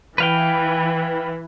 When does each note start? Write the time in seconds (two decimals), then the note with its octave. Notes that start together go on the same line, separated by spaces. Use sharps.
0.18 E3 B4 F5 G5